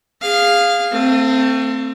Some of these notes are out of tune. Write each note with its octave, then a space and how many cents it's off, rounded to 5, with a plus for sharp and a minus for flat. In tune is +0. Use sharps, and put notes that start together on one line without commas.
G#4 -20 F5 +0
A3 +30 C4 -5